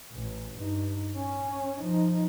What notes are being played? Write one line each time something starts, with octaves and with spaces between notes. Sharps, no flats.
A1
G2 D#4
C#4
F3 D#4